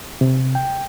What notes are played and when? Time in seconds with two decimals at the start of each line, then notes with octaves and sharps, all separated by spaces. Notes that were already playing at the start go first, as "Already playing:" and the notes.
0.21 C3
0.55 G5